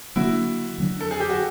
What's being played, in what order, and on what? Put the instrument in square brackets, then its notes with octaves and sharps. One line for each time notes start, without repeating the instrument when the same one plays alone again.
[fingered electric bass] D3 F#3 A#3 D4 [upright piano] E4 F#4
[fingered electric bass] D3 F#3 A#3 D4
[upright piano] A4
G#4
G4
F#4